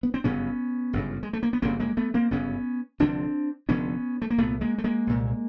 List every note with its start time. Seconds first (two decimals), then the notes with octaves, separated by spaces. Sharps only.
0.03 B3
0.14 C4
0.24 G1 F#2 C#3 B3 C#4
0.93 G1 F#2 C#3
1.23 G#3
1.33 A3
1.43 A#3
1.53 B3
1.62 G1 F#2 C#3 A#3 C4
1.80 G#3 A#3
1.97 A3 B3
2.14 A#3 C4
2.31 G1 F#2 C#3 B3 C#4
3.00 F1 D#2 D3 C4 D4
3.69 F1 D#2 D3 B3 C#4
4.22 A3
4.30 A#3
4.38 C2 A#2 A3 B3
4.61 G#3 A#3
4.78 A3
4.84 G#3 A#3
5.07 C2 A#2